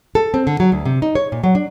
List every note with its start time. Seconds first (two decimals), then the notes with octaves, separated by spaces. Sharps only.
0.15 A4
0.34 C4
0.47 D3
0.60 F#3
0.72 D2
0.85 C3
1.02 D#4
1.15 C#5
1.32 A#2
1.44 F#3
1.55 D4